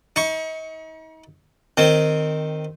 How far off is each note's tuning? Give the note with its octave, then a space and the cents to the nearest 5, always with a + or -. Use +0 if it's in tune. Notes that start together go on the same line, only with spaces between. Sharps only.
D#4 +40 C#6 +0
D#3 -10 C4 -5